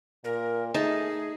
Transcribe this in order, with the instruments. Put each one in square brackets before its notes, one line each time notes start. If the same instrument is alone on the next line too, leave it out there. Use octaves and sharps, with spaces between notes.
[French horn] A#2 [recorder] A#4
[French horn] A3 [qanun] D#4 A5 [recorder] G#4